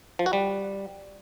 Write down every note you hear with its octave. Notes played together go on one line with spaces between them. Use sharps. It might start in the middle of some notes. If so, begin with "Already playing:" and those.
F3
F#4
G3